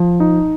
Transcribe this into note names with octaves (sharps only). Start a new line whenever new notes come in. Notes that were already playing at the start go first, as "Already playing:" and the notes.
Already playing: F3
D#4